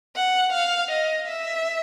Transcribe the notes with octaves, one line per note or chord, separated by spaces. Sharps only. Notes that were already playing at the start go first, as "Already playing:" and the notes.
F#5
F5
D#5
E5